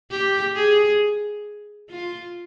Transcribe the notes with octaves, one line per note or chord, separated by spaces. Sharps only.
G4
G#4
F4